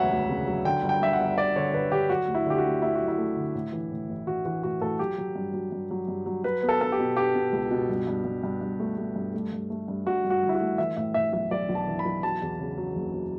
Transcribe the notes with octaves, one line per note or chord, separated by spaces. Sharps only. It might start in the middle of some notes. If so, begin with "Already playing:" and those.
Already playing: E1 D2 C#3 F#3 B4 C#5 E5 F#5
D2
C#3
F#3
D3 G5
G1
G5
G2 E5
F#5
G1
G1 D5
D3 C#5
D3 B4
D3 G4
F#3 F#4
D2
E4
D3 G4
F#4
A3
A3 E4
F#3 F#4
E4
A3
D3
A2
E3
A2
A1
E3 F#4
E3 F#4
A2 F#4
A2 A4
F#3 G4
F#3
G2
F#3
G2
F#3
G2
F#3
F#3 B4
B3
A4
B3 A4
G4
B2
B3 G4
B2
C#2
B2
G2
G2
G2
G2
G2
A3
A3
G2
A3
G2
A3
G2
G2 F#4
G2
F#4
G1
E4
F#4
A3
E3 E5
A2 E5
A2 E5
B1 E5
B1 D5
B1
A5
E3
B5
B1
F#3 A5
E2
C#3
F#3
F#1
F#3